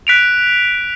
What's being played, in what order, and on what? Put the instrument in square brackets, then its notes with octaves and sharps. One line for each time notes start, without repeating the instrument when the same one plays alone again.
[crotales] F#6 B6 D7 F7